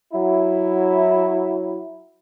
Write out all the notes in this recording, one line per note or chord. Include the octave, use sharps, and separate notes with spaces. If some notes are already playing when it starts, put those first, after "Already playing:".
F#3 E4